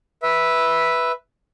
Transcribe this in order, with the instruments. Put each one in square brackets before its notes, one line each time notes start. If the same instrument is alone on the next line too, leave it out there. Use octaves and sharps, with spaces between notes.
[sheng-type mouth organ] B4 E5